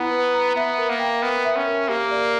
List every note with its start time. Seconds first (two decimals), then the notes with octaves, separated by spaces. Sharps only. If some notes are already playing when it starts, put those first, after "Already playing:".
Already playing: B3 E4 B4 F#5 A#5
0.11 B4
0.34 A#5
0.56 B3 E5
0.78 A#4
0.89 A#3
0.99 G5
1.22 B3 A#4
1.45 E5
1.56 C#4
1.67 A#4
1.89 A#3 G4
2.11 D5